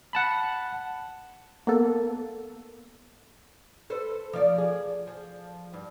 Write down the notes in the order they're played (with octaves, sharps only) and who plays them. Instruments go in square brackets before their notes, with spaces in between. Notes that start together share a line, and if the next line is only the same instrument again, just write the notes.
[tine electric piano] F#5 A5 B5
[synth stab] A#3 B3 A4
[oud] A4 B4 C5
F3 D5
G#4
F3
G2